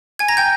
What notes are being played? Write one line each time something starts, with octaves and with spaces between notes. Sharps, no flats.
G#5 G#6
A#5 A#6
G5 G6